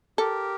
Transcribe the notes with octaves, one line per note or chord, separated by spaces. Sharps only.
G4 A4 A#4